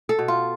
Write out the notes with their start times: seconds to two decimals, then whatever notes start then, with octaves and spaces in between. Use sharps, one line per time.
0.09 A4
0.19 B2
0.28 F4